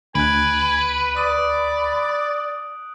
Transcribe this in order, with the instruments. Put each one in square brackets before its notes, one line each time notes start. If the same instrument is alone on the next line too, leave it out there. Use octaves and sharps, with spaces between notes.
[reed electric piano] D2 [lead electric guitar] B4 [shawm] G#5 [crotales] F#6 D7
[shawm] D5 [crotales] D#6